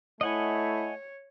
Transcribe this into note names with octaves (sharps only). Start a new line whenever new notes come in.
A3 E4 C#5 D#5 F#5 G#5